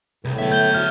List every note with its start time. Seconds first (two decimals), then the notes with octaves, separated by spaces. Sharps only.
0.25 C2 A2 G#4 B4
0.38 D3 F#3 B3 G#4 E5
0.52 A3 G6 G7
0.74 F#4 C#5 F5 F6